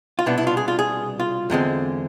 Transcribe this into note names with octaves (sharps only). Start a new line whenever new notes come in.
F4
C2 B2 B3 D4 E4
E4
F4
G#4
F4
G#4
F4
E2 D3 G#3 C4